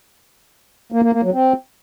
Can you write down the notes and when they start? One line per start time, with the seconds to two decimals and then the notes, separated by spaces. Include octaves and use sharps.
0.92 A#3
1.03 A#3
1.13 A#3
1.23 F#3
1.33 C4